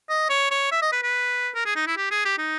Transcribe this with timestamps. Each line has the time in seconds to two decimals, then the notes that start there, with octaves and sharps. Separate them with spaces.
0.09 D#5
0.30 C#5
0.51 C#5
0.71 E5
0.82 D#5
0.92 B4
1.03 B4
1.55 A#4
1.65 G#4
1.76 D#4
1.87 E4
1.97 G4
2.11 G#4
2.25 G4
2.38 D#4